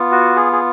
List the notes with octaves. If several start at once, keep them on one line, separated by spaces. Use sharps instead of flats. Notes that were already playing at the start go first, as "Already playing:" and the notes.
Already playing: B3 F4
F#4
G#4
G#4